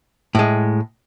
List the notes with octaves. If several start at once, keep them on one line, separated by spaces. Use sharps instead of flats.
A2 G#3